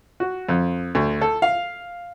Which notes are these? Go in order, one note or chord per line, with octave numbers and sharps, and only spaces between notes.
F#4
F2
D2
A4
F5